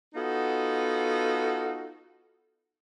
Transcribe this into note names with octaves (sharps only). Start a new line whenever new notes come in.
B3 D#4 F4 F#4 A4